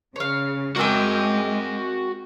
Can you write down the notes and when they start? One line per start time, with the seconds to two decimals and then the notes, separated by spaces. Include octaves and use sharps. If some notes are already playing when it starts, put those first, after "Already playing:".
0.16 C#3 C#5 F5
0.77 G#3 A#3 C4 F#4 G5 G#5